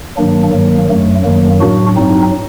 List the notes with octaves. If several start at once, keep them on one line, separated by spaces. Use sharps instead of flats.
G2 D#3 F#3 A#3 D4
G2 D#3 F#3 A#3
F#2 F#3 A3
F#2 D#3 F#3 A#3
A2 F#3 D4 F#4
G2 F#3 C4 D#4